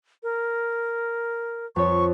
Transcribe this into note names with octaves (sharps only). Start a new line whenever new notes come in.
A#4
F2 C#5 C#6